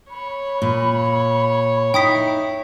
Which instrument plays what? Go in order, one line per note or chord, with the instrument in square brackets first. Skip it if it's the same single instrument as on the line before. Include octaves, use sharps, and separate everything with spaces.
[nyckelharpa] C#5 [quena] B5
[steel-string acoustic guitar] A#2
[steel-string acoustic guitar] D#4 E4 [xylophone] G5 D#6 B6